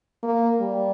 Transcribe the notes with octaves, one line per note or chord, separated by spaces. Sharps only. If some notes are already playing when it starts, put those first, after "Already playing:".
A#3
G3